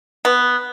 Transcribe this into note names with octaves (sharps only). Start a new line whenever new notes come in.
B3